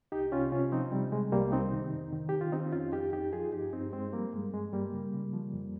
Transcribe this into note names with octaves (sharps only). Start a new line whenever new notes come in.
C2 D#4 G4
C3 C#4 F4
C3 C#4 F4
F3 C4 D#4
C3 G3
C3 G#3
C2 G3 A#3
C3 C4 D#4
D#3
F2
D#3
D#3 G4
F4
D#3 C4 D#4
F2 C#4 F4
F2 D#4 G4
F2 D#4 G4
F3 F4 G#4
G2 D#4 G4
G2 C4 D#4
G2 G#3 C4
F3 G3 A#3
G2 G#3
G2 G#3
G2 G3 A#3
C#3
C#3
F3
F2